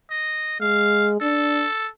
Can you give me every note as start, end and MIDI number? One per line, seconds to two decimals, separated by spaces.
0.10 0.57 75
0.60 1.20 56
0.60 1.09 77
1.21 1.66 62
1.21 1.88 69